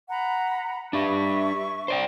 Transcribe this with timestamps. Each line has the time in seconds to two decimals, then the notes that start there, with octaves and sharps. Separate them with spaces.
0.08 F#5 A#5 B5
0.93 D4 G4 E5 C#6
1.88 C5 D5 G5